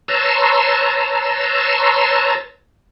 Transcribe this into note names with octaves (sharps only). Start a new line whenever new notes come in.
B4 C#5 A5 A#5 C6 E6